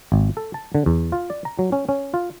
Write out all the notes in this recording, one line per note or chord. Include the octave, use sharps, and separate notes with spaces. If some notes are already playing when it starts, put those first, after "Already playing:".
G#1
A4
A5
D3
E2
F4
D5
A#5
F#3
C#4
C#4
F4